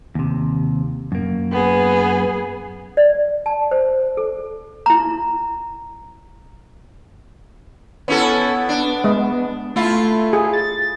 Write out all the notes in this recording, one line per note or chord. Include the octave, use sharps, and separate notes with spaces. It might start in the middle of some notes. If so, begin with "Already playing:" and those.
D#2 C3
F#2 A#3
B3 G#4
D5
A5
C5
A4
E4 A#5
B3 C#4 E4 A4
D4
G#3 D#5
A3 E4 F4
G#4
A6